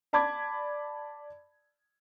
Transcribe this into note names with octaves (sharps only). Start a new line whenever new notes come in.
D5 A5 B5 D6 G#6